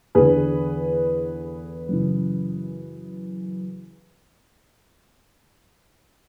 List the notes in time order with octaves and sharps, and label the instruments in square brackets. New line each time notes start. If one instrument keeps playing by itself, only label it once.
[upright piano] E2 D3 G#4 B4
F#2 C#3 E3